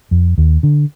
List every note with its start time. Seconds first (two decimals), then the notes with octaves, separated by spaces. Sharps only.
0.11 F2
0.38 D#2
0.63 D3